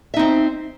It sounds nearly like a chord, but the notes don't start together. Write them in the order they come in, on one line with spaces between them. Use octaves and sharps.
E5 D#4 C4